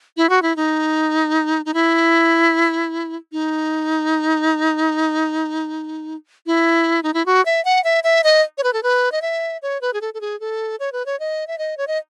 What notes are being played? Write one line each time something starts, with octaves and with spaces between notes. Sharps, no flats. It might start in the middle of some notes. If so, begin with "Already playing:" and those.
E4
F#4
E4
D#4
D#4
E4
D#4
E4
D#4
E4
F#4
E5
F#5
E5
E5
D#5
C#5
B4
A4
B4
D#5
E5
C#5
B4
G#4
A4
A4
G#4
A4
C#5
B4
C#5
D#5
E5
D#5
C#5
D#5